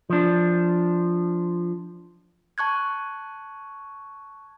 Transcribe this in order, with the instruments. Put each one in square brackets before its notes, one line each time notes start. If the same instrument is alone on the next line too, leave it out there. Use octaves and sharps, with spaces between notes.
[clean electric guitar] F3 D4
[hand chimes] A5 C#6 F#6 G#6